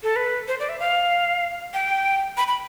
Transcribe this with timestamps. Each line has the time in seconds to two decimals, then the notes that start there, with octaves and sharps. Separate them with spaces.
0.03 A4
0.16 B4
0.48 C5
0.60 D5
0.69 E5
0.80 F5
1.74 G5
2.37 B5
2.48 B5